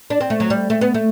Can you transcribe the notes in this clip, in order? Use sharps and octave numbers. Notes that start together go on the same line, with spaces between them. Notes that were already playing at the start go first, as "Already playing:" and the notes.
D4
C4
A3
F#3
G3
A3
B3
A3